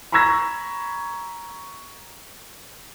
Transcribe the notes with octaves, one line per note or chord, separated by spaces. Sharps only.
A#5 B5 C#6 E6 G#6 A#6